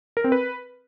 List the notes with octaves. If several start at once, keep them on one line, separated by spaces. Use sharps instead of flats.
A#4
C4
B4